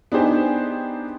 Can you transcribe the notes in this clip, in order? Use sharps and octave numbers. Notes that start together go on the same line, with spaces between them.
B3 D4 D#4 G4 G#4 C5